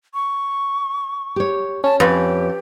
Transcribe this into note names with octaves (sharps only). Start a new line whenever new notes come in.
C#6
G4 C#5
C#4 A5
F2 G4 B4